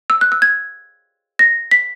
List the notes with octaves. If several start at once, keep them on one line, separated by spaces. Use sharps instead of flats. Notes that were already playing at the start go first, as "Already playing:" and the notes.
E6
F#6
E6
G#6
A#6
B6